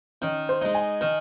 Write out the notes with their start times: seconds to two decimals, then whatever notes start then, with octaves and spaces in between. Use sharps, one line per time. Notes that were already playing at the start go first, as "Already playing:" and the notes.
0.22 D#3 C#4
0.49 C5
0.62 G#3 D#4
0.74 G#5
1.01 D#3